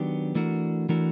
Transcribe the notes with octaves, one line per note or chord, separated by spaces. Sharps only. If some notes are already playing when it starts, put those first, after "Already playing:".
Already playing: D#3 F#3 B3 D4 G4
E3 A3 D4 F#4 A#4
E3 A3 D4 F#4 A#4